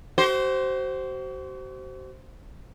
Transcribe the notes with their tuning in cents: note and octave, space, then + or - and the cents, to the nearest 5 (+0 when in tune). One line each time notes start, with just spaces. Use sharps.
F#4 +45 C5 +0